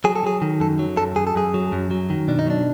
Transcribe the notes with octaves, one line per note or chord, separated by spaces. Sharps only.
F#3 G#4
A4
F#3 G#4
D#3
F#2 A4
F#3
F#2 A4
F#2 G#4
A4
F#2 G#4
F#3
F#2
F#3
D#3
B2 D4
D#4
F#3 D4